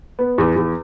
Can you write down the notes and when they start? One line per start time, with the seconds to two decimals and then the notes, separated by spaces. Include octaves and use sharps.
0.19 B3
0.38 E2
0.56 E2